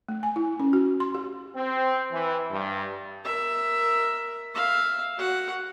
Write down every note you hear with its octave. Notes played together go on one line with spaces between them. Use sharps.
A3
G#5
E4
C#4
F#4
C6
G4
C4
E3
G2
A#4 E5
E5 F5
F#4 F#5